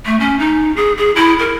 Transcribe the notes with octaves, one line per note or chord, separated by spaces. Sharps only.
A3
C#4
D#4
G#4
G#4
E4
A#4